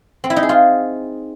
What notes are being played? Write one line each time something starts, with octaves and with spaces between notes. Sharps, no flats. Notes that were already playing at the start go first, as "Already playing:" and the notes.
C4
E4
D#4
G#4
F4